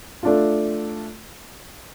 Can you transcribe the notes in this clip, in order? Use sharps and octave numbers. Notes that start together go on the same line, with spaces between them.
A3 D4 F4